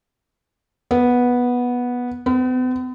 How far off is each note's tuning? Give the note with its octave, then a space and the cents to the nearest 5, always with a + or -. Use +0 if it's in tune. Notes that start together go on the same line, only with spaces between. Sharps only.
B3 -10
B3 +45